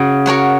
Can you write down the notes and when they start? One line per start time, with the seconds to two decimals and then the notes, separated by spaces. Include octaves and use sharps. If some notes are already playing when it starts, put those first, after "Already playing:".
Already playing: C#3 F#4
0.26 F#4 A#4 C#5 F#5